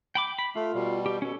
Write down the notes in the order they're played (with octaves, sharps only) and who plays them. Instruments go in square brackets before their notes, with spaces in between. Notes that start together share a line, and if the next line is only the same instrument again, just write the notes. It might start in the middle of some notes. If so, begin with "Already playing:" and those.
[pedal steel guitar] G5 B5 D6
B5
[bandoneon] A3 [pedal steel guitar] F4
[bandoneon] B2 G3
[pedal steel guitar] G4
[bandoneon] B2 [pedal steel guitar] C#4 A4